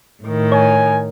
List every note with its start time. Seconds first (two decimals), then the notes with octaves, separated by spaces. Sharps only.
0.23 A2 D#3
0.52 C#5 G#5